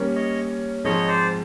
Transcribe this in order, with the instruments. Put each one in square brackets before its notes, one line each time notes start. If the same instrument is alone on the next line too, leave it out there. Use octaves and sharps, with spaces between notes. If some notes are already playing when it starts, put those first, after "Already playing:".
Already playing: [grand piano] G3 A#3 C#4
[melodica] C#5 D#5
[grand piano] G#2 F3 G#3 C4 [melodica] C#5 D#5
[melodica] C5 D5